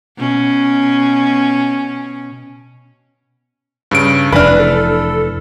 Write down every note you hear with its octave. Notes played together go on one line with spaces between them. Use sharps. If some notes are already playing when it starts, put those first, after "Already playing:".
B2 C#4
G2 C#3 D7
F1 E3 D4 B4 B5 F6
A4